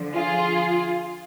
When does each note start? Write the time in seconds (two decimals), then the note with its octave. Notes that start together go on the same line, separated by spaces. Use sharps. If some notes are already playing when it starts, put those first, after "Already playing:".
Already playing: D3 F3
0.14 F4 G#4